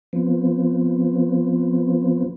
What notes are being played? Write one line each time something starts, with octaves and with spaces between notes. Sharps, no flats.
F3 B3 C4